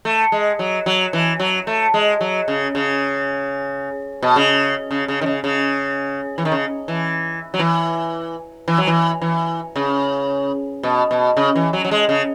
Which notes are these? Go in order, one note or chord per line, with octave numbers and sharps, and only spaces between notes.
A3
G#3
F#3
F#3
E3
F#3
A3
G#3
F#3
C#3
C#3
B2
C#3
C#3
C#3
D#3
C#3
C#3
E3
D#3
C#3
E3
F#3
E3
E3
F#3
E3
E3
C#3
B2
B2
C#3
E3
F#3
F#3
G#3
C#3